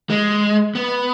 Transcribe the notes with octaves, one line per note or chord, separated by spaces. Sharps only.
G#3
B3